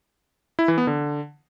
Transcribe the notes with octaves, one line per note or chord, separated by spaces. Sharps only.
E4
E3
B3
D3